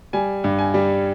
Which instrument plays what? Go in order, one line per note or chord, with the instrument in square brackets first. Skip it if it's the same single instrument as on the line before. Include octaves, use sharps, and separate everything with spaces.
[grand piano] G3 G#5
G2
G#5
G3